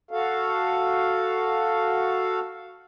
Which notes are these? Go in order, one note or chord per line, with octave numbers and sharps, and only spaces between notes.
F#4 A4 F5